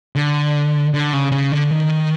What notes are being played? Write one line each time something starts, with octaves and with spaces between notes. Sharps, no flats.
D3
D3
C#3
C#3
D3
D#3